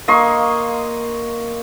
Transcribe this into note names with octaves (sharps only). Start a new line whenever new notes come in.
A#3 D#5 C6 C#6